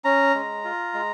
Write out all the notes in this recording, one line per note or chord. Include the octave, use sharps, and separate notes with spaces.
C#4 A#5
G#3
F4
G#3